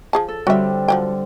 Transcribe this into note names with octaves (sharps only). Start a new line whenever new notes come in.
F3 G#4 A5
A4
D3 G3 C4 F#4 E5
F3 F#3 G5